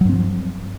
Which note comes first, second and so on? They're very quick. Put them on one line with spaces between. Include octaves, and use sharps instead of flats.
F#3 G2 C4 F3